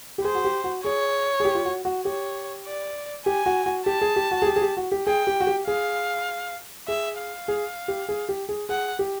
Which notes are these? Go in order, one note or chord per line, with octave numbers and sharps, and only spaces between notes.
G4
G#4 C5
F#4
G4
F#4
G#4 C#5
G#4
G4
F4
F#4
F#4
G4 C#5
D5
G4 G#5
F#4
F#4
G4 A5
G#4
G4
F#4
G#4
G4
G#4
G4
F#4
G4
G#4 G5
G4
F#4
G4
G#4 F5
G#4 E5
F5
G#4
G4
G#4
G4
G#4
G#4 F#5
G4